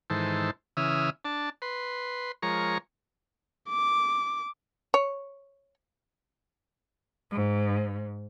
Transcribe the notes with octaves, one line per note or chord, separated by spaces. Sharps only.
G#2 D#3 E3 A4 C5
C#3 E3 E5 D#6 F6
D4 A5
B4 C6
F3 G#3 A#4 C#5 A#5 C#6
D6
C#5
G#2